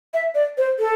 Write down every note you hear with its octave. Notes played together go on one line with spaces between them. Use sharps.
E5
D5
C5
A4